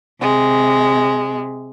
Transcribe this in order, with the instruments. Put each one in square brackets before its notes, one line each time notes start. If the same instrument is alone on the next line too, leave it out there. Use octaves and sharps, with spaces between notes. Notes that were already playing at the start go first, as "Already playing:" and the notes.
[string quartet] C3 G#3